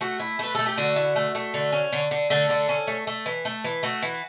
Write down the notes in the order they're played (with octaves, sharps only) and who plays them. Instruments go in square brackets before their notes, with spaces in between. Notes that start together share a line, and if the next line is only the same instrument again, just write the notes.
[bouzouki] A3 F#4
E4
A3 B4
A3 A4
G4
D3 F#4
E4
A3
A3
D3
C#4
D3
D3
D3 A3 A4
D3
C#4
A3
A3
E3
A3
E3
A3 F#4
E3